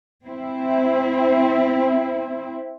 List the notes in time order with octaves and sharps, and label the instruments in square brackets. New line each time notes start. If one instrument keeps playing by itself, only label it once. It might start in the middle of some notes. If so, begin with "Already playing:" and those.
[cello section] C4 E4